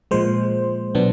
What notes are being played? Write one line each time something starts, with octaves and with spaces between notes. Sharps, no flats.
A#2 F3 G#3 C5
B2 F#3 B3 D4